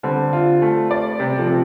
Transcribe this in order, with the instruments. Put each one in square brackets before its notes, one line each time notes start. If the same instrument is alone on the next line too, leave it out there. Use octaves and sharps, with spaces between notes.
[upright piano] D3 [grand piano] G3 C4
[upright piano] F4
A3
D5
[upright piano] C3 [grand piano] G3
[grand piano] F3 A3
[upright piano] C3